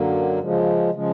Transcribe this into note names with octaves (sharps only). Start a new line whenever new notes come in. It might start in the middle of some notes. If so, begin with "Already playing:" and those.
Already playing: F#2 D3 F#3 A#3
C#3 F3 G#3
C#3 F3 G#3